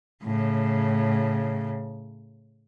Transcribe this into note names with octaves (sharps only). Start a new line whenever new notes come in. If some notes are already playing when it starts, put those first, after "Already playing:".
A2 C#3